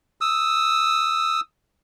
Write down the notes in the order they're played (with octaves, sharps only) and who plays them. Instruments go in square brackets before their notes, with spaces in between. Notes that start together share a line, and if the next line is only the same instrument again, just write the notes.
[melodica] D#6 E6